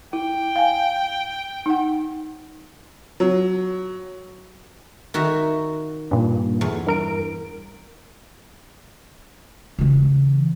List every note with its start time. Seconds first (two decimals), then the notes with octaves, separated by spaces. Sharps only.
0.13 E4 G5
0.56 F5 G#5
1.66 D#4 F#5
3.20 F#3
5.14 D#3 F#4 E5
6.11 G2 A#2
6.61 E2
6.87 G2 A#4 D7
9.79 C#3 E3